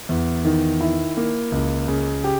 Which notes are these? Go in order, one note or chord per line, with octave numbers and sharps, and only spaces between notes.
E2
D#3
E4
A#3
C#2
C#3
G4